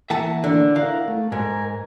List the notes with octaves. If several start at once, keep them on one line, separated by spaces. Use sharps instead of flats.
E3 A#3 E5 F#5 A5
D3
E4 A#4 F5 F#5
A3
G#2 A#4 G#5